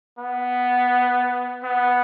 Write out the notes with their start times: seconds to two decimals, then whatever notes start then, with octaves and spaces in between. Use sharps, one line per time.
0.19 B3
1.64 B3